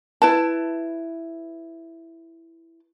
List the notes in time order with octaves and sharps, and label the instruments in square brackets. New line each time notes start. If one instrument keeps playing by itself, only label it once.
[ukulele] E4 B4 A5